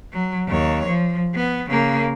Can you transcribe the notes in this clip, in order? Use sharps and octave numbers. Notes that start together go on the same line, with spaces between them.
F#3
D#2 C#5
F3
B3
C#3 A#3